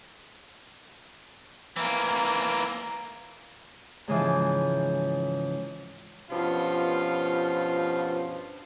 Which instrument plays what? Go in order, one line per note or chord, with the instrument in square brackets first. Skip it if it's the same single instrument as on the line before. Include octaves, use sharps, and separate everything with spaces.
[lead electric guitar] E3 A#3
[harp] G#2 C#3 E3 F3
[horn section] G2 B2 F3 C#4 F4